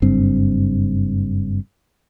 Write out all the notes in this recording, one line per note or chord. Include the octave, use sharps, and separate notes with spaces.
F#1 G2 C4